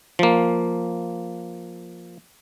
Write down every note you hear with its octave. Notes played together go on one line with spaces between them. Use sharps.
F3 A#3